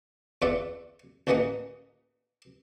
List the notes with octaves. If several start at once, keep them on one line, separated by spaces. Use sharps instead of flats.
E2 F4 D5 E5 F#5
A1 A#2 E3 A#3 D#5 F#5